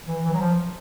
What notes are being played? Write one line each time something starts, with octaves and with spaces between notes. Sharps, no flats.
E3
E3
F#3
F3